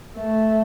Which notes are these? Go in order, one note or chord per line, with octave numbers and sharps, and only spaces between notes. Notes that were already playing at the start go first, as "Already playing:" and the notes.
A3